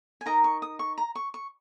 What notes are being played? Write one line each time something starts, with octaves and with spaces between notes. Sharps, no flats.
G#5
D#4 A#4 D#5 A#5
C#6
D#6
C#6
A#5
C#6
C#6